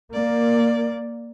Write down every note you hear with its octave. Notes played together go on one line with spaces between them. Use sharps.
A#3 D5